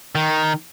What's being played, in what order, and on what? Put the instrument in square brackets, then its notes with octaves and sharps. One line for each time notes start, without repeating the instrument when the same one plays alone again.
[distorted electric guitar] D#3